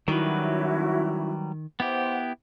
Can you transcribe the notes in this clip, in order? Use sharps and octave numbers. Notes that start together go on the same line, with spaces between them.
D#3 F#3 G3 C#4 E4 F#4 B4
B3 E4 G4 C5 F#5